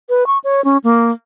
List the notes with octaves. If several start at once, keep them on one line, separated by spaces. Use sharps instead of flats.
B4
C#6
C#5
C#4
A#3